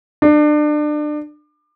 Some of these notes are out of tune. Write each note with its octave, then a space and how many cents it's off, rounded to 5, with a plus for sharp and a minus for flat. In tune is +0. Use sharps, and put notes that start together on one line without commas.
D4 +30